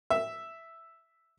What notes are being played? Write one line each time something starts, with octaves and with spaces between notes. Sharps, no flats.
E5